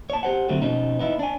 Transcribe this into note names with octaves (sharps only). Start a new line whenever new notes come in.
C#5 A5
G4 C5 F#5
D3 F#3 A3 C4
B2 F3 C#4 D#4
B3 D#4 E4
D4 G#5